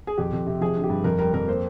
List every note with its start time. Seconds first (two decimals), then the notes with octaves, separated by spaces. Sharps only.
0.07 G#4
0.18 F2 G4
0.33 F2
0.47 C3
0.61 F3 G#4
0.76 D3
0.84 G4
0.90 G2
1.04 F2 A#4
1.19 G3 A#4
1.34 F2 A#4
1.48 A#3 C5